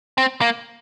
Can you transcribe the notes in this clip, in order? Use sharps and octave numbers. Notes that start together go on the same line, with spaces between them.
C4
A#3